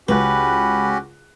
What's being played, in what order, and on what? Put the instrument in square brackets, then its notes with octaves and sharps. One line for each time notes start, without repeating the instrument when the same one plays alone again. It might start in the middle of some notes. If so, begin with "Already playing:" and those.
[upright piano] C#2 F#6 [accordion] C#4 F#4 G4 [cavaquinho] B4